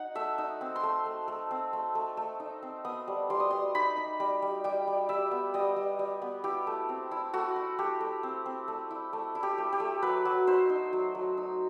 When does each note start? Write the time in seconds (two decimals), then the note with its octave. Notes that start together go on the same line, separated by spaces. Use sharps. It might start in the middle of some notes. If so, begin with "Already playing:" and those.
Already playing: D#4 F#5
0.15 A3 E5
0.38 D#4
0.61 C4
0.76 C6
0.83 A3
1.06 A3
1.28 A3
1.51 C4
1.73 A3
1.95 A3
2.17 A3
2.40 D#4
2.62 C4
2.85 B3 D#6
3.08 G3
3.30 G3 C6
3.40 D#6
3.51 G3 C6
3.75 D#4 B5
3.97 D#4
4.20 G3 B5
4.42 G3
4.64 G3 G5
4.87 G3
5.09 G3 E5
5.31 B3
5.54 G3 D#5
5.76 G3
5.99 G3
6.22 B3
6.44 E4 G4
6.67 A3
6.89 C4
7.11 E4
7.33 A3 F#4
7.56 E4
7.78 A3 G4
8.00 A3
8.23 C4
8.46 C4
8.68 A3
8.91 E4
9.13 A3
9.35 E4
9.43 G4
9.58 A3
9.73 G4
9.80 A3
10.02 F#3 B4
10.25 F#3
10.47 D#4 C5
10.69 D#4
10.93 F#3
11.15 F#3
11.37 D#4